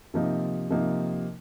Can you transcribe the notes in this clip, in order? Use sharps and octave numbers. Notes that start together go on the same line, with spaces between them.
C3 F3 A#3 D#4
C3 F3 A#3 D#4